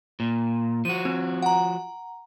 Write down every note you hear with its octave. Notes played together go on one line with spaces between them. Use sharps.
A#2
F3 F#4 D#7
C4
F#5 A#5